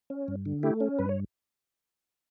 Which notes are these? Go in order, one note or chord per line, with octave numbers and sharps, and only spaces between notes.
C#4
G2
D3
A3 E4 G4
C#4
G2 B4
C#5